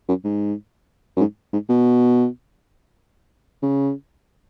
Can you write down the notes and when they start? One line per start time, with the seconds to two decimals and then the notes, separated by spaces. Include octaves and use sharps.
0.08 F#2
0.24 G#2
1.17 F#2
1.20 G#2
1.53 G#2
1.69 B2
3.62 C#3